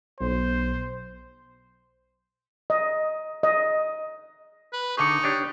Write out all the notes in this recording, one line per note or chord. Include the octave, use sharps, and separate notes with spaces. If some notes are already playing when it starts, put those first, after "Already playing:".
B1 C5
D#5
D#5
B4
D3 D#4 G#4 C#6 D6 C#7
D4 G4 C#5